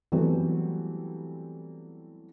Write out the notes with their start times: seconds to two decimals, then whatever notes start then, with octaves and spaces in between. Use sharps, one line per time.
0.12 E3 F#3 G3 A3 B3 C4